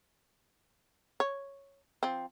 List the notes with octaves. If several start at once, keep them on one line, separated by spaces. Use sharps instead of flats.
C#5
F3 C4